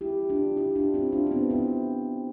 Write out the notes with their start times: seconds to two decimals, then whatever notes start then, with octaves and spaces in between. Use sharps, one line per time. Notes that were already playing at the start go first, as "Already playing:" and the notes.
0.01 E4 G4
0.29 D4 F4
0.57 E4 G4
0.75 D4 F4
0.94 C4 E4
1.12 D4 F4
1.27 C4
1.31 B3 D4
1.49 C4 E4